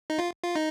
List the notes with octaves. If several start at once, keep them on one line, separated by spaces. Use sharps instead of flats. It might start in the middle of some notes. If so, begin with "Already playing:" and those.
D#4
F4
F4
D#4